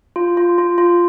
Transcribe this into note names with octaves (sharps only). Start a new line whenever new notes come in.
F4
F4
F4
F4